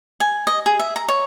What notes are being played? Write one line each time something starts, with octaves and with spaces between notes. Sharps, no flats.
G#5
D#5
G#4
E5
A#5
C#5